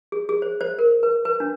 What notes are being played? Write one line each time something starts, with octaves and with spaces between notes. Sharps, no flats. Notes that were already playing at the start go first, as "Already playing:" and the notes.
G#4
G#4
C5
C5
A#4
B4
B4
D4